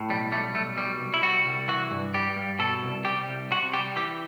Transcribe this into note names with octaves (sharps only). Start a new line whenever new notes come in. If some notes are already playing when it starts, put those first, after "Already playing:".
Already playing: A2
B1 G3
G3 A3
B1 A3
B2 G3
C2
E4
G3 F#4
C2
E3 F#4
G2
G3 G4
G2
B2 A4
C2
G3 G4
C2
C3 F#4
G3 G4
E3 G4